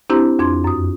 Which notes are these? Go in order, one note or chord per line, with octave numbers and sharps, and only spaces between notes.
C4 D4 E4 G4 C5 A#5
F2 D4 C6 G#6
F#2 D#6